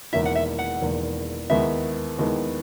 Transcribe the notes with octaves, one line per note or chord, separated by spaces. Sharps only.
E1 E2 D#3 A#3 E4 E5
F#5
E5
F#5
E1 E2 D#3 A#3 E4
D#2 D#3 G#3 B3 E4 E5
D#2 D#3 G#3 B3 E4